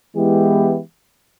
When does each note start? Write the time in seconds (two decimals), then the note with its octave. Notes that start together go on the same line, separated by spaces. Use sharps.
0.14 E3 G#3 B3 E4 G4